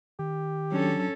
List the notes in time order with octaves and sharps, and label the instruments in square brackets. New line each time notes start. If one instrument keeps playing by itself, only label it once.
[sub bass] D#3 [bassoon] G4
[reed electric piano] F#3 D4 A5 [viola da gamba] C#4 A4